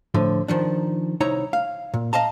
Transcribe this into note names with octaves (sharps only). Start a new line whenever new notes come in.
A2 D3 F3
D#3 F3 D4
C2 D#4 E4 C#5 A#5
F5
A#2
D#5 F5 A5 A#5